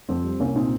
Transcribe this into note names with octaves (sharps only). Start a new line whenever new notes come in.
F2 C4
G3
C2 A#3 C#4
A#2 C4 D#4